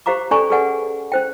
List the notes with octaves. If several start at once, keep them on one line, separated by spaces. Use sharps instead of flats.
G4 C5 F5 A#5 D6
C#4 A4 D5 G#5 A#5 C#6
G#4 A4 B4 D5 F#5 G#5
C#4 C5 G5